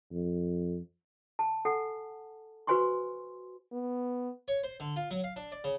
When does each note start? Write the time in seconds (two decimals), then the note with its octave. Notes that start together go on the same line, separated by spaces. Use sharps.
0.11 F2
1.39 A5
1.65 A4 F#5 G#5
2.67 F#4 B4 C5 G#5 C6 C#6
3.72 B3
4.48 C#5
4.64 C5
4.80 D3
4.96 F4
5.11 F#3
5.24 F5
5.36 D4
5.52 D5
5.64 C#3